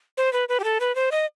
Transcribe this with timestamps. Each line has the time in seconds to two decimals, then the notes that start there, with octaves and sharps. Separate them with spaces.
0.17 C5
0.33 B4
0.49 B4
0.60 G4
0.64 A4
0.80 B4
0.95 C5
1.12 D#5